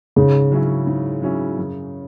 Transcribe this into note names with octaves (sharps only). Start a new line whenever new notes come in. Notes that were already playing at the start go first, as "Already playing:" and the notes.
G#2 C#3
F#3 C#4 E4
G#2
F#3 C#4 E4
F#2